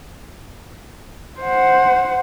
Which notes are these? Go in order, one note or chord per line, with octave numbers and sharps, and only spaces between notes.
C5 F#5